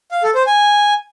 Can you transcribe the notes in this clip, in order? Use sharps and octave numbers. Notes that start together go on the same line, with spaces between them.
F5
A4
C5
G#5